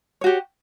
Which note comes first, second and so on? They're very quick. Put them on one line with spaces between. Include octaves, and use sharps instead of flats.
C#5 F#4 G4